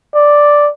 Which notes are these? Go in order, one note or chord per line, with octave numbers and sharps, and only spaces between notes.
D5